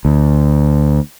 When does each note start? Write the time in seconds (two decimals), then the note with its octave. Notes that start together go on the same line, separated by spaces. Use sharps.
0.05 D2